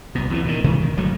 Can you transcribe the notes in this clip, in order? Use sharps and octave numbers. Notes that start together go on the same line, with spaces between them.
C2 B2
E2 C3 E3
A#2 D3 D#3
C3 E3 G#3 B3
D#3
G1 F#3 A3